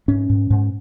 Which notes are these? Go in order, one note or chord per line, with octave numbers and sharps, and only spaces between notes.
G#2 C#4
G#2
G#2